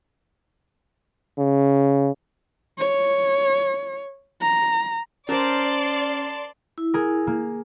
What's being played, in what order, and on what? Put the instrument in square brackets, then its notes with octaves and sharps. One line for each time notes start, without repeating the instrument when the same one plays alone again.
[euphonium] C#3
[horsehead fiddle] C#5
A#5
[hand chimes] C#4 [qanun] A#4 C5 [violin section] D5 C6 [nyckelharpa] A5
[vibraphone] E4
[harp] G#4 A#4
A#3